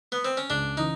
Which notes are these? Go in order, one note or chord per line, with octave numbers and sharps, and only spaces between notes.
B3
C4
C#4
C#2 D4
C#3 E3 D#4